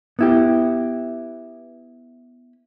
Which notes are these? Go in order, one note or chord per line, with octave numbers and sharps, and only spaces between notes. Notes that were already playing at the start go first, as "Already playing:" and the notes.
B3 E4 G4